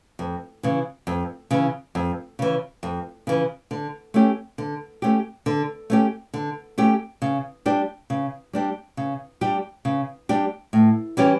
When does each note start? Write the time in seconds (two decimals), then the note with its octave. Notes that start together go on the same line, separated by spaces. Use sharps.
0.19 F2
0.63 C#3 E3
1.07 F2
1.51 C#3 E3
1.95 F2
2.39 C#3 E3
2.83 F2
3.27 C#3 E3
3.71 D3
4.14 A3 C#4 G4
4.58 D3
5.02 A3 C#4 G4
5.46 D3
5.90 A3 C#4 G4
6.34 D3
6.78 A3 C#4 G4
7.22 C#3
7.66 G3 D4 G4
8.10 C#3
8.53 G3 D4 G4
8.97 C#3
9.41 G3 D4 G4
9.85 C#3
10.29 G3 D4 G4
10.73 A2
11.17 E3 G3 C#4 G4